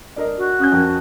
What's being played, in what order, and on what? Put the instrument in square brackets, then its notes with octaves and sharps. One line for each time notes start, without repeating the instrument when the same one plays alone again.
[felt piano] D4 A#4 D#5
[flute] F#4
[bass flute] C#4 [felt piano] D#6 G6
[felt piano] F2 A#4 G5